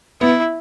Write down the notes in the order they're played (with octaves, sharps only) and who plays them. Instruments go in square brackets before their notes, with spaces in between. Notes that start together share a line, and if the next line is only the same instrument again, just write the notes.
[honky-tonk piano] B3 [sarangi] E4